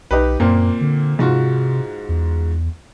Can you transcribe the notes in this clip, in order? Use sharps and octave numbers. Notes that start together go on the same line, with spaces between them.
B1 D#4 G4 B4
F#2 A#2 A#3 C4
D3
G#2 C3 F4 F#4
E2